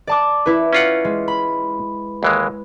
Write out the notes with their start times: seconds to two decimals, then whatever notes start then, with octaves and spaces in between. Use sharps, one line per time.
0.07 D5 A5 D6
0.46 E4 B4
0.73 C#4 F4 F#5
1.05 G#3
1.28 B5
2.23 D#2 E3 G#3